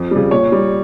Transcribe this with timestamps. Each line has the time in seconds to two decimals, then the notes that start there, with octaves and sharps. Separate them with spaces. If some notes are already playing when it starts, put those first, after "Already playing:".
Already playing: F2
0.11 C#3 G3
0.31 A#2 C#5
0.52 G3